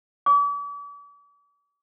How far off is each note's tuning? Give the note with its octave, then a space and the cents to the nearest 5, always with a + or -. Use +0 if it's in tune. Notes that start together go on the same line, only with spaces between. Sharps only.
D6 -40